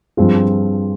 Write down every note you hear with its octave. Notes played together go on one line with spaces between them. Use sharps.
G2 F3 C4 F4 G#4